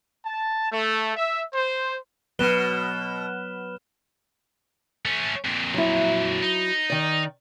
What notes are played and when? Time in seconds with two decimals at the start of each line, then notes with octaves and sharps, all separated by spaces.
0.25 A5
0.71 A3
1.16 E5
1.53 C5
2.39 B2 F#3 B3 B4 F6 E7 G7
5.05 A3 C#4
5.45 F2 A#2
5.74 F#3 E4
6.42 D#4
6.90 D#3 D5